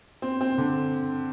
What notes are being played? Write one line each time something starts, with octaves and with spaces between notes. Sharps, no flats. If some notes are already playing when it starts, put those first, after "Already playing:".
C4
C4
D3